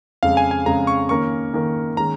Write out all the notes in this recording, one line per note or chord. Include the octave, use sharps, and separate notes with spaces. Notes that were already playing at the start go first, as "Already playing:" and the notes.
F2 C#3 G#3 F5
G#5
G#5
F2 C#3 G#3 A#5
C#6
D#3 A#3 C#4 A#4 C#6
D#3 A#3 C#4 A#4
D#3 G#3 C#4 A#5